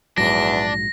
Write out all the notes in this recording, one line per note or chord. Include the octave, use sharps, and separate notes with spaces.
A#1 E2 G#2 F#3 D4 A#6